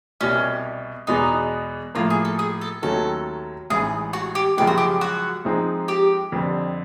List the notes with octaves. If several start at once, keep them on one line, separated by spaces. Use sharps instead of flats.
C2 B2 G3 C#4
E2 B2 G#3 B3 D#4
A2 F3 A#3 F4
G#4
A4
G#4
A4
D#2 D#3 F#3 A3 C#4 A4
A1 G#2 E3 G#4
F#4
G4
F#2 C#3 F3 G#3 G4
F#4
G4
F#4
G#2 F3 G#3 C4 D#4
G4
F2 D3 G3 C4